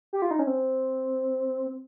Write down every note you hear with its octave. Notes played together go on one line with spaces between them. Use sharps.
G4
F4
D#4
C#4
C4